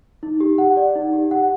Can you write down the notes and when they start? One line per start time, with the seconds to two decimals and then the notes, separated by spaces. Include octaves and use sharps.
0.23 D#4
0.40 G4
0.58 F#5
0.77 D5
0.95 D#4
1.13 G4
1.31 F#5